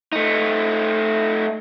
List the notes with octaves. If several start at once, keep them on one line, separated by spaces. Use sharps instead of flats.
A3 D#4